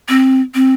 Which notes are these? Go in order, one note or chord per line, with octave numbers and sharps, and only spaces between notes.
C4
C4